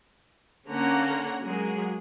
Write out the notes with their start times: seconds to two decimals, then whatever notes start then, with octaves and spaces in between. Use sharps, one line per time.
0.69 D3 A#3 C#4 F#5 A#5
1.43 F#3 G#3 A#3 G#4